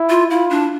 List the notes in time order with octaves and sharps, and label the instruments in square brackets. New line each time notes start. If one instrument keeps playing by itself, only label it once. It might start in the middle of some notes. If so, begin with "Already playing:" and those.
Already playing: [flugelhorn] E4
[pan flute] F4
[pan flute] E4 [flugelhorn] F4
[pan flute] D4